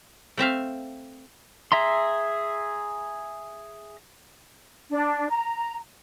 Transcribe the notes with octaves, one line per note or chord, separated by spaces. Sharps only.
A3 C4 E5 F5
G#4 E5 A#5 C6
D4
A#5